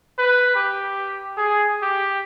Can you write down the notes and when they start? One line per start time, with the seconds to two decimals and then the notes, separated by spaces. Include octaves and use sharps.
0.19 B4
0.55 G4
1.37 G#4
1.82 G4